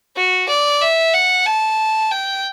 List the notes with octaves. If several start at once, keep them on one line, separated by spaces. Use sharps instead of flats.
F#4
D5
E5
F#5
A5
G5